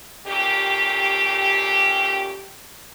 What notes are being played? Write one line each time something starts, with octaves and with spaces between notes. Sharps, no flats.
A#2 A3 C#4 G4